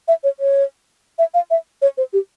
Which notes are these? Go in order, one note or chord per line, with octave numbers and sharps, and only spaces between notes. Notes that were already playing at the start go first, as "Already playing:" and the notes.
E5
C#5
C#5
E5
F5
E5
C#5
C5
G4